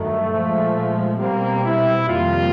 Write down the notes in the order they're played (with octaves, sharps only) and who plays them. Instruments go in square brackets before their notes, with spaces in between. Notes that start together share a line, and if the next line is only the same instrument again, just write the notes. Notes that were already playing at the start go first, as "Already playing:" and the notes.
Already playing: [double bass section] G2 D#3 F#3 [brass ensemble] A3
[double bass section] A#2 F3 G#3
[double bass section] B2 G3 C4 [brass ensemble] A#3
[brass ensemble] E4
[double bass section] F2 C3 D#3 G3 A#3 [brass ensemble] F4